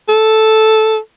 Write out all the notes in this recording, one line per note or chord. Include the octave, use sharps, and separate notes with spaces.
A4